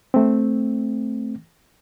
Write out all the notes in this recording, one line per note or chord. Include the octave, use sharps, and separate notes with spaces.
A3 C4